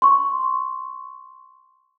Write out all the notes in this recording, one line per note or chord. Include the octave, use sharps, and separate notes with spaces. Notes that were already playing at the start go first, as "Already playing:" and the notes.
C6 C#6